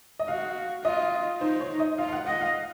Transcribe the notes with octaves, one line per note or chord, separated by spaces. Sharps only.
D#5
F#4 F5
F4 D#5
D#4 C5
C#5
D#5
F4 F5
F5
F#5
D#5 F#5
F5